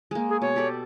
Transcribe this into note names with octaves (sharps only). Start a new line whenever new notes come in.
G#3 A#3
G#4
B2 C#5
G4 A4 D5